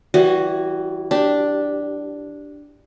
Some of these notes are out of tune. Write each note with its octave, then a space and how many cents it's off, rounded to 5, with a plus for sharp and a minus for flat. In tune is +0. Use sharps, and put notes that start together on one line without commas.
E3 +0 G3 -25 F#4 +5
D4 +0 G4 +0